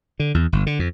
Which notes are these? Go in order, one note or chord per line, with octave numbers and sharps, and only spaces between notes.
D3
E2
G1
D3
F2